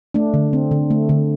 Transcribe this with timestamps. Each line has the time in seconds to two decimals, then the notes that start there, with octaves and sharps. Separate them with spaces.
0.14 A3 D4
0.34 D3
0.53 C4
0.71 D3
0.90 A3
1.09 D3